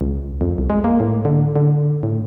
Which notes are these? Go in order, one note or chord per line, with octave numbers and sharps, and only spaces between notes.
C#2
F2
C2
G#3
A#3
A2
D3
D3
A2